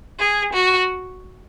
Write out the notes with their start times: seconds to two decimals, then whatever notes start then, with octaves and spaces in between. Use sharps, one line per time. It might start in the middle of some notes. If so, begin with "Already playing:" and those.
0.19 G#4
0.53 F#4